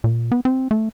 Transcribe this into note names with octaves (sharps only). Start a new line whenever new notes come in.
A#2
B3
C4
A3